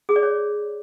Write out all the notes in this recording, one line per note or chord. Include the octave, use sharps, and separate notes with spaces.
G#4
D5
C#5